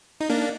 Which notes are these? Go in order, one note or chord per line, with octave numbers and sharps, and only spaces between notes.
D#4
A#3 D4